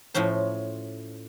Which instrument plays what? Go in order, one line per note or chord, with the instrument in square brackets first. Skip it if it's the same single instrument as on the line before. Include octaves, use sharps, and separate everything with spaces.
[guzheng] A2 F3 C#4 C5